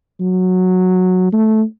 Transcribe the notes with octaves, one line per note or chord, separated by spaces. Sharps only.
F#3
A3